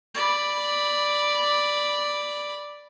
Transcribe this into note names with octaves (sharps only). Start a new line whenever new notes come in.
D5 B5